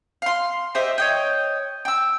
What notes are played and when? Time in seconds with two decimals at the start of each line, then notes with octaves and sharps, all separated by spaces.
0.22 F5 C6
0.75 G4 C5 D#5 E5
0.98 C#5 D#5 G5
1.85 G5 E6